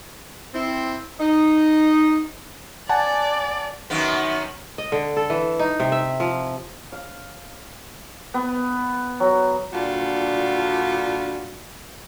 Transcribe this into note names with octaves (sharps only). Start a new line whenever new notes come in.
C4 E4
D#4
D5 F#5 G#5 A5
F#2 D#3 B3
D#5
D3
A4
E3
D#4
C3
E5
F3
F5
B3
F#3
A#2 D3 G3 D4 F4 F#4